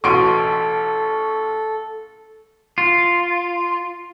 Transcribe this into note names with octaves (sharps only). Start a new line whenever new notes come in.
A1 B2 A4 C6 C#6 D7 D#7
F4